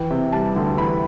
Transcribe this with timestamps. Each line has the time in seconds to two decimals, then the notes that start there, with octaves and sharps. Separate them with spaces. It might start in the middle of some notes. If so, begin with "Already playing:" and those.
Already playing: E3 G5
0.11 C3
0.32 G3 A5
0.56 D2
0.77 E3 B5